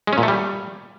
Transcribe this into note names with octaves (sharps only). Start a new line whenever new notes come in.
G#3
C#4
A#2
A3
G3